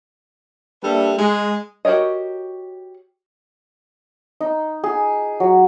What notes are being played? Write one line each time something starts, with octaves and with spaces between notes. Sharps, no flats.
G3 A#3 D4 A4 B4 E5
G#3
F#4 G4 A#4 C#5 D#5
D#4
G#4
F#3